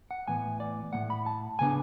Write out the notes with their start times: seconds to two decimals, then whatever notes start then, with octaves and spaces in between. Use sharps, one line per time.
0.11 F#5
0.28 A2 E3 B3 G#5
0.60 D5
0.93 A2 F#3 A3 F#5
1.10 B5
1.26 A5
1.59 C#3 B3 D4 G#5